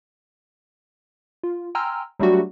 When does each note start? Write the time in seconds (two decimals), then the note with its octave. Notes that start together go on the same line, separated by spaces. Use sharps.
1.43 F4
1.75 G5 G#5 A#5 C6 E6 F6
2.19 F#3 G3 A3 D4 F#4 G4